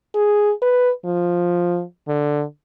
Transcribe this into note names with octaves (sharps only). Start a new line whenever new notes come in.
G#4
B4
F3
D3